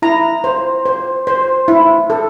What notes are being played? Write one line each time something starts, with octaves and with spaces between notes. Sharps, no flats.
E4 A#5
C5
C5
C5
E4
A4